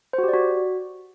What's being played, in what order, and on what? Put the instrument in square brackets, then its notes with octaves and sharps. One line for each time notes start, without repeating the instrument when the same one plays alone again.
[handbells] C5
F#4
G4
D5
F#4